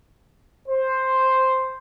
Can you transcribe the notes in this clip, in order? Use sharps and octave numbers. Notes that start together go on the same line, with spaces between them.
C5